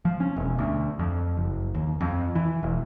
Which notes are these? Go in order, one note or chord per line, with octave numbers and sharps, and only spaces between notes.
F3
C#4
E1
D2
F2
F#1
D#2
F2
E3
E1